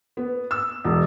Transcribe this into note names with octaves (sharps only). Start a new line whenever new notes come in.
B3
E6
E1